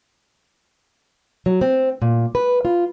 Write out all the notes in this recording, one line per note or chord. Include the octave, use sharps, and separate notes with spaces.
F#3
C4
A#2
B4
F4